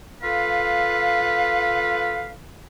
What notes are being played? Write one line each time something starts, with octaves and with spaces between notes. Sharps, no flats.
F4 A4 B4 F5